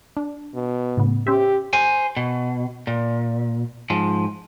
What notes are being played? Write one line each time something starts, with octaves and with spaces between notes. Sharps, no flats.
D4
B2
A2 C#3 B3
C#4 G4 C5 E5
C5 G#5
B2
A#2
G#2 F3